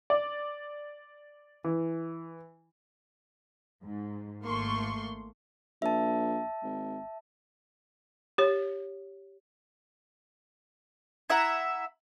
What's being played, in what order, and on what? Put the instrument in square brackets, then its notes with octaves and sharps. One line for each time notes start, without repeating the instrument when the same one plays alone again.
[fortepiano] D5
E3
[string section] G#2
G#1 A3 A#3 C6 C#6
[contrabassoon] A#1 [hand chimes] E5 A5
[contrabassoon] G#1
[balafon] G4 C#5
[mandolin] E4 E5 F#5 A#5